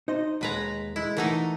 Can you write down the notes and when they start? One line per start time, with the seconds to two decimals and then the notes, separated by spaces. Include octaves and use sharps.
0.08 D#4 C5 D#5
0.41 D#2 B2 G#3 B4 A#5
0.96 G#3 E4
1.17 E3 A3 D#4 A#4 F#5